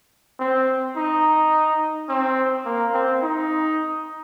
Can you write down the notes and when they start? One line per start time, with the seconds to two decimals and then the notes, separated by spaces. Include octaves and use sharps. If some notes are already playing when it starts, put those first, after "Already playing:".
0.40 C4
0.96 D#4
2.09 C4
2.65 A#3
2.94 C4
3.22 D#4